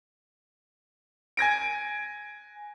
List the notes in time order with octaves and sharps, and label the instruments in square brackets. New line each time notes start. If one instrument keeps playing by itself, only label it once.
[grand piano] G#5 G#6 A#6 D7